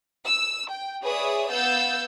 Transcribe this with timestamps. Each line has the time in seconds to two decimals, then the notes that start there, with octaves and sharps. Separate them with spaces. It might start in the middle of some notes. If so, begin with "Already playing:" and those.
0.24 E6
0.71 G5
1.03 G#4 B4 C#5 D5 E5 D#6
1.51 B3 F5 F#5 E6 G6 A6